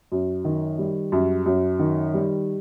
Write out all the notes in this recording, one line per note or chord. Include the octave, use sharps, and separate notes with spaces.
F#2
D#3
G3
F#2
F#2
D#3
G3